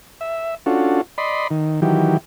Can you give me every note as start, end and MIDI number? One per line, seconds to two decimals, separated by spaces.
0.21 0.55 76
0.66 1.01 61
0.66 1.01 62
0.66 1.01 65
0.66 1.01 66
0.66 1.01 69
1.18 1.48 74
1.18 1.48 75
1.18 1.48 83
1.18 1.48 84
1.50 1.80 51
1.82 2.17 51
1.82 2.17 52
1.82 2.17 54
1.82 2.17 67